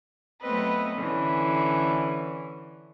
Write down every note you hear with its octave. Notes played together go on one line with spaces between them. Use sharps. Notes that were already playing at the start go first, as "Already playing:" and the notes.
F#3 A3 B3 C4 B4 D#5
D3 E3 C#4